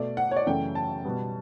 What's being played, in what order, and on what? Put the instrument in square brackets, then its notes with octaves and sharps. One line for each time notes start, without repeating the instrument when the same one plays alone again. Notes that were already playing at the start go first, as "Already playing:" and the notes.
Already playing: [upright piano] B2 A3 D5
F#5
C#5
D5
F#2 C#3 E3 A3 G5
A5
B2 G3 B3